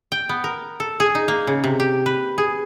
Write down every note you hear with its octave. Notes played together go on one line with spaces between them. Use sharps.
G5
B3
A#4
A4
G#4
D#4
A#3
C#3
C3
G4
B4
G#4